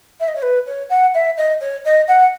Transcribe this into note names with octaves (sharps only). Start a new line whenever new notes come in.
E5
D#5
C#5
B4
C#5
F#5
E5
D#5
C#5
D#5
F#5